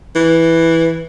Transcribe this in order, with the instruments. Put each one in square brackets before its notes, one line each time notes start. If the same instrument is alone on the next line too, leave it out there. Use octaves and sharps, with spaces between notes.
[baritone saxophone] E3